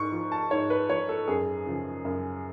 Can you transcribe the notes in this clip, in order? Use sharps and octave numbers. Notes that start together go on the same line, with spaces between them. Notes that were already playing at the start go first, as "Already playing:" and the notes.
Already playing: G#2 C#6
F3
A5
G#2 C#5
B4
F3 C#5
A4
F#2 G#4
C#3 F3
F#2